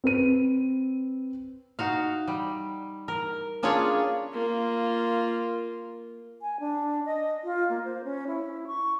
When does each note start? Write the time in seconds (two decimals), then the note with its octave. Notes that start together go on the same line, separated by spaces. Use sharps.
0.04 C4 B4 D#7
1.79 D#4 F#4 F5
2.28 G3
3.08 A#4
3.63 A#3 C#4 D4 F4 G#4 C#5
4.32 A#3 F4
6.42 G#5
6.60 D4
7.06 D#5
7.44 F4
7.70 A#3
7.85 C5
8.04 C#4
8.27 E4
8.67 C#6